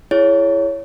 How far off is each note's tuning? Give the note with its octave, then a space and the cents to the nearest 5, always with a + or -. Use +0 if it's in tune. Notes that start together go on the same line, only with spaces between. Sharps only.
E4 +25 G#4 +0 C#5 +10